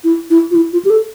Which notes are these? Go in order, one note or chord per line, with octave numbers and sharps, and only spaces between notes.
E4
E4
F4
E4
F4
G4
A4